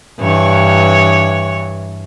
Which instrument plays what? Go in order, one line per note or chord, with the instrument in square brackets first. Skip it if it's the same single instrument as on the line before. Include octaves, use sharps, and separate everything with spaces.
[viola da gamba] G2 E3 C#5